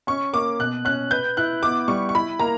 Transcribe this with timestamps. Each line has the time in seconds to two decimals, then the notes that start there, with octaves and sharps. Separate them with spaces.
0.07 C#4 C#6
0.33 A#3 D6
0.59 B2 F#6
0.85 C#4 F#6
1.11 B4 G6
1.37 E4 F#6
1.63 B3 D6
1.88 G3 C#6
2.09 C#6
2.14 E4 B5
2.40 A#3 A#5